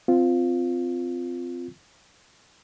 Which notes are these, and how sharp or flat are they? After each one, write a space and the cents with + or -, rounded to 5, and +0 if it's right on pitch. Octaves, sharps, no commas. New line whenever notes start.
C4 -15 F4 +0